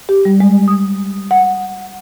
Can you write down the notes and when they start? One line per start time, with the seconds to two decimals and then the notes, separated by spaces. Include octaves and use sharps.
0.09 G4
0.25 G3
0.40 G#3
0.68 D#6
1.31 F#5